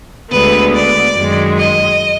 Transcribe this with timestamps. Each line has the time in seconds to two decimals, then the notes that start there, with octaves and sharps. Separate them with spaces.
0.31 D2 D3 G#3 B3 B4
0.74 D5
1.16 F#2 D#3 G#3
1.59 D#5